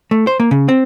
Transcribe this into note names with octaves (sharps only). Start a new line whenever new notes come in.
A3
C5
A#3
C#3
C4